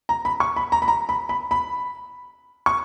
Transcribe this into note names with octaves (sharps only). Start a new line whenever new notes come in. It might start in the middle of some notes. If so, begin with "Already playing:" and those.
A#5
B5
C#6
B5
A#5
B5
A#5
B5
B5
B5
C#6